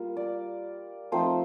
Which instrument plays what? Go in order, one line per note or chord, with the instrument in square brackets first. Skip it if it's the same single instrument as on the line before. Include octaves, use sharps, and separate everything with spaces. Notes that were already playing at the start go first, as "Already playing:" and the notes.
Already playing: [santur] G3 A#3 F4
D5
F3 A3 C4 D#4 C5